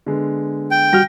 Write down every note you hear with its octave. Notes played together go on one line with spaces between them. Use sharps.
D3 G#3 B3
G5
G3 F#4 F6 A#6 G7